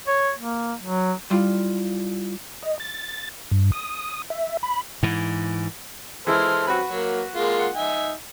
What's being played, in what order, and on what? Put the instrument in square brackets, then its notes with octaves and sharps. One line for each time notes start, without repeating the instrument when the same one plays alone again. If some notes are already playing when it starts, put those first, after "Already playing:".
[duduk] C#5
A#3
F#3
[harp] G3 E4 F4
[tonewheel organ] D#5
A6
G2
D#6
E5
B5
[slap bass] G#2 E3
[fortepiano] E3 G#3 E4 [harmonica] A4 C5 F6
[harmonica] F#3 C4 [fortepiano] F#4 B4 B5
[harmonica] F#3 A#3
G#3 A#3 F4
[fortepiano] F#5
[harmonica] D#4 E5 G#5